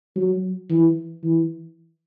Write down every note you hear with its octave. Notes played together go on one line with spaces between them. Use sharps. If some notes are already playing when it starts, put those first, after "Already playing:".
F#3
E3
E3